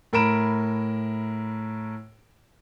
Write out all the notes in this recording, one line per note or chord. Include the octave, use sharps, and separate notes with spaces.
A2 A#4 B5 D7 E7